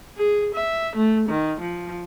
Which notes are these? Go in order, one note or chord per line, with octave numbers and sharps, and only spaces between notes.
G#4
E5
A3
D#3
F3